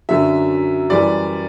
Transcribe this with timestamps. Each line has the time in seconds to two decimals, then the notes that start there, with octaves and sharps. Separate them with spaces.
0.09 F#2 D3 F#3 E5
0.90 F#2 E3 G3 D5